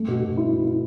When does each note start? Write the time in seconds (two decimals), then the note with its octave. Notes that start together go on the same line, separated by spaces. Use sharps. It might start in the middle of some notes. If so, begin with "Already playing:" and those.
Already playing: A3
0.08 B2
0.23 B2
0.37 E4
0.51 E4
0.66 E4